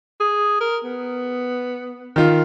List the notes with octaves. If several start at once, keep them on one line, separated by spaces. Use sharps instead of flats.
G#4
A#4
B3
D#3 F4